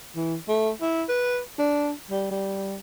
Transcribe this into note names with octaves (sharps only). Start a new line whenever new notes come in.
E3
A3
E4
B4
D4
G3
G3